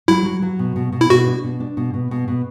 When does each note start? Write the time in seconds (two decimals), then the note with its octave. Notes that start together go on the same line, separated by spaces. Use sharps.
0.08 F#3 E4
0.25 F#3
0.42 F#3
0.59 B2
0.76 B2
0.92 B2
1.01 E4
1.10 B2 F#4
1.26 D4
1.44 B2
1.60 D4
1.77 B2
1.94 B2
2.11 B2
2.28 B2